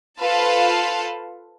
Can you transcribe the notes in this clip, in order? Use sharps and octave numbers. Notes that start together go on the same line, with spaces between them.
F4 A4 B4 C5 F5 A5